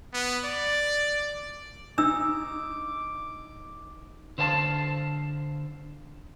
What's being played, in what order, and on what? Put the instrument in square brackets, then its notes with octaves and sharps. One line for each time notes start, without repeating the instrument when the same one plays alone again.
[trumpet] B3
D5
[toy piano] D4 E6 [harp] D#4 [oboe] D6
[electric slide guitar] D3 C5 F5 G#5 A5